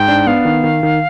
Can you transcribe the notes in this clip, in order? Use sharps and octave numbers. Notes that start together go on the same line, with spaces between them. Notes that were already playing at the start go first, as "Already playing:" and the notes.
Already playing: G#2 G5
D4
B3 F5
D#3
D#3
D#3